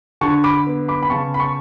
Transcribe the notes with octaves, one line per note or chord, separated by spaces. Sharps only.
D3 A5 C#6
B5 D6
B3
B5 D6
B5
C#3 A5 C#6
B5
A5 C#6